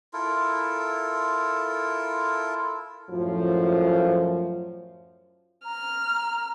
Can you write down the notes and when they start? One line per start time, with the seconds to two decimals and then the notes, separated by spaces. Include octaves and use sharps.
0.13 E4 F4 A4 A#4
3.11 F#2 A2 F3
5.65 A#5 F6